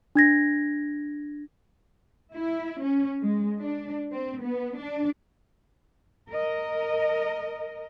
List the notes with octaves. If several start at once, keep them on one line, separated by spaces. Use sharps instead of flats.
D4 G#6 A#6
E4
C#4
G#3
D4
C4
B3
D4
A#4 D#5